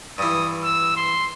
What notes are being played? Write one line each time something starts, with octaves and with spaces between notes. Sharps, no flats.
G2 E3 D#6
E6
C6